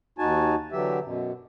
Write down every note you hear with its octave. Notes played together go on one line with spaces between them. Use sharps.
D#2 D#4 F#4 G#5 A5
D3 E3 F#3 G4 E5
F#2 B2